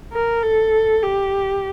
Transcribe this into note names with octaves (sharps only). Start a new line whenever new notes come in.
A#4
A4
G4